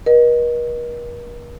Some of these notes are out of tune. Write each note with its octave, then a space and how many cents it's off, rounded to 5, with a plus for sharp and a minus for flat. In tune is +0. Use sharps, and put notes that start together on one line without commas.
A#4 +45 D#5 -15